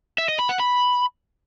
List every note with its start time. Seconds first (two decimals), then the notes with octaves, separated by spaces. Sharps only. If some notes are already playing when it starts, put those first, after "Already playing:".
0.18 E5
0.29 D#5
0.39 B5
0.49 F#5
0.59 B5